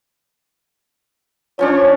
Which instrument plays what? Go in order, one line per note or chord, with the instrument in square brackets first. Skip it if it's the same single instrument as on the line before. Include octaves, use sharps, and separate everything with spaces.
[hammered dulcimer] F3 C#4 D4 [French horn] C#5